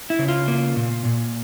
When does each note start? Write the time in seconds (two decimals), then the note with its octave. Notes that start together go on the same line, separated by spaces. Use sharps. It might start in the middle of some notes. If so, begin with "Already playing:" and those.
0.10 E4
0.19 C#3
0.28 F4
0.48 A#3
0.76 A#2
1.05 A#2